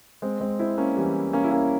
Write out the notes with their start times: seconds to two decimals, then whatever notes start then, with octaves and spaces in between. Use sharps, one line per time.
0.22 G#3 C4
0.40 G#3 C4
0.59 C4 E4
0.78 A#3 C#4
0.97 E3 G3
1.33 A#3 C#4
1.44 E4
1.51 A#3 C#4